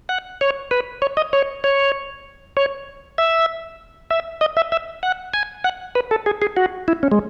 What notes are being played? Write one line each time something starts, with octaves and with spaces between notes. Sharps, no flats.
F#5
C#5
B4
C#5
D#5
C#5
C#5
C#5
E5
E5
D#5
E5
E5
F#5
G#5
F#5
B4
A4
G#4
G#4
F#4
E4
C#4
G#3